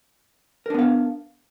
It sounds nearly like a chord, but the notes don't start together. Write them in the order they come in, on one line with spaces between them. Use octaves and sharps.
A#4 D4 B3 F5